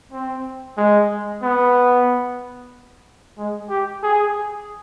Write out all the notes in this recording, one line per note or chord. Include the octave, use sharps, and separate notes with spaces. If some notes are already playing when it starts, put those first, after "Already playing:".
C4
G#3
B3
G#3
G4
G#4